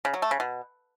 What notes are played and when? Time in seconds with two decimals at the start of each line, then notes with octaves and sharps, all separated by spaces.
0.05 C#3
0.14 F#3
0.22 A3
0.31 C#3
0.40 B2